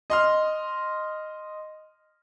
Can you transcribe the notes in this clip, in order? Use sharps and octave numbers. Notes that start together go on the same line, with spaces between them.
D#5 C6 F6